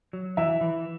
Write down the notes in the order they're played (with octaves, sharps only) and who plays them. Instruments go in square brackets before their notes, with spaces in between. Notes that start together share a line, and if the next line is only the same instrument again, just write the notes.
[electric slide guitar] F#3
[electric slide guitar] E3 [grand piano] E5
[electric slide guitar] E3